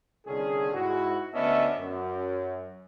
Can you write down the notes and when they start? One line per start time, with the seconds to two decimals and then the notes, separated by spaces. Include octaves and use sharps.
0.27 C2 D3 D#3 C#4 G#4
0.74 G#2 E4 F#4
1.34 D2 B3 C#4 D4 D#5 E5
1.77 F#2